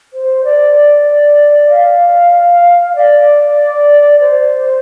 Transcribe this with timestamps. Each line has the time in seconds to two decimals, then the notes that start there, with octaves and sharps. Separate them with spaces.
0.13 C5
0.44 D5
1.70 F5
2.95 D5
4.20 C5